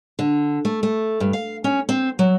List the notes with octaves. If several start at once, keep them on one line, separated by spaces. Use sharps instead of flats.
D3
A3
A3
G2
F5
C#4
C4
F#3